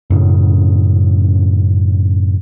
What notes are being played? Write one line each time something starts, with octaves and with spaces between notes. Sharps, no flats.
F#2 A2 C#3